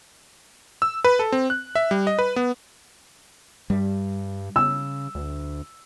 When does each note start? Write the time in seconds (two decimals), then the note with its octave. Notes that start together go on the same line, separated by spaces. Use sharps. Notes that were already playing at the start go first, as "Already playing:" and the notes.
0.82 E6
1.04 B4
1.19 A4
1.32 C4
1.50 F#6
1.75 E5
1.91 G3
2.07 D#5
2.19 B4
2.36 B3
3.70 G2 G3
4.56 C#3 E6
5.15 D2